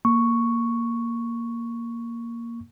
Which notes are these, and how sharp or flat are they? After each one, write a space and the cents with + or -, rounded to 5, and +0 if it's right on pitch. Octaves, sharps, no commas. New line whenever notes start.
A#3 +0 C#6 +0